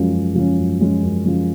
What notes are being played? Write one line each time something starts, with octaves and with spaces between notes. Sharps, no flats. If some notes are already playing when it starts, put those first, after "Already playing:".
Already playing: F#2 F3 G#3 C#4
F#2
F3 G#3 C#4
F#2
F3 G#3 C#4
F#2
F3 G#3 C#4